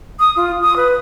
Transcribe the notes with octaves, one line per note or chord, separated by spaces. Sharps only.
D#6
F4
D#6
B4